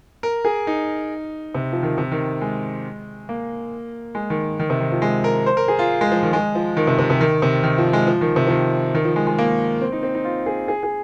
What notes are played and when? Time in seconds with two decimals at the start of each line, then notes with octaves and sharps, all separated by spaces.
0.23 A#4
0.45 G#4
0.67 D#4
1.55 C3
1.72 F3
1.83 D#3
1.98 C3
2.12 D#3
2.41 G#3
3.29 A#3
4.15 G#3
4.30 D#3
4.59 D#3
4.70 C3
4.80 D#3
4.92 F3
5.02 G#3
5.24 A#4
5.46 C5
5.57 A#4
5.68 G#4
5.79 F4
6.01 G#3
6.12 F3
6.23 D#3
6.33 G#3
6.55 F3
6.77 D#3
6.87 C3
6.98 C3
7.10 C3
7.21 D#3
7.42 C3
7.63 D#3
7.78 F3
7.93 G#3
8.07 F3
8.21 D#3
8.36 C3
8.47 F3
8.50 D#3
8.94 D#3
9.05 F3
9.16 G#3
9.27 G#3
9.38 A#3
9.81 C4
9.92 D#4
10.03 C4
10.15 D#4
10.25 F4
10.46 G#4
10.68 G#4
10.83 G#4